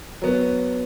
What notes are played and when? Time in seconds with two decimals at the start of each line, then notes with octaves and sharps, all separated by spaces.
0.22 F#3 B3